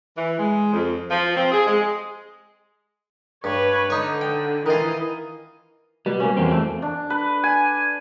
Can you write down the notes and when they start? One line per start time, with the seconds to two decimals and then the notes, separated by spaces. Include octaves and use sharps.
0.17 E3
0.39 G#3
0.74 F2
1.11 F3
1.36 C4
1.52 G#4
1.67 G#3
3.44 G2 B4 C#5
3.90 D3 D#4 C#5
4.21 G5
4.66 D#3 E3 F4 D#5
6.06 B2 G3
6.20 A#3 C#4
6.37 E2 C4
6.51 A3
6.82 D4
7.10 B4
7.44 G#5